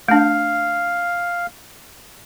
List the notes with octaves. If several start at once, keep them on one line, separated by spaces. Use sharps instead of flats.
A3 D4 F5